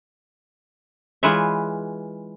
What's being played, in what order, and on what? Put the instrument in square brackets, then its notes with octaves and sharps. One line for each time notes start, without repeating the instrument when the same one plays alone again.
[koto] E3 G#3 F4 B4 C#5 E5